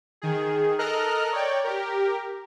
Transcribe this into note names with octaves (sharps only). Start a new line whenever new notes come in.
D#3 G#4
A4 A#4 D#5 A#5 F6 F#6
C#5 D5 G5
G4 A#4